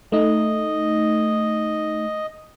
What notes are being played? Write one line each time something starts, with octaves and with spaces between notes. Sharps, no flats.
A3 D#4 D#5